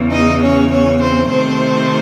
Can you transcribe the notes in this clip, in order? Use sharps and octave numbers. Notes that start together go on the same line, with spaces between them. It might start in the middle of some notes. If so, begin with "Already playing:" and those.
Already playing: E2 C#3 E3
D#4 D#5
C#4 C#5
C#4 C#5
C4 C5
C3 D#3 A3 C4 C5